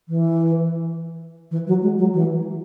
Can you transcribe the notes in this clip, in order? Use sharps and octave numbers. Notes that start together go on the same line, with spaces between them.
E3
E3
F#3
G#3
F#3
E3